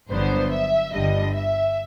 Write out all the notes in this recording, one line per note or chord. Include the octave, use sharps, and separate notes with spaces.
G1 G2 D3 F#3 B3 C5
E5
G1 G2 D3 G3 D#5
E5